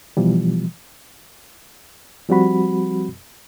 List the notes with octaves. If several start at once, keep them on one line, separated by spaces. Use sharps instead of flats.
B2 E3 F3 G3
F3 G3 C4 F#4 B5